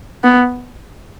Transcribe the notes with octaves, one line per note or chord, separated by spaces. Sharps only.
B3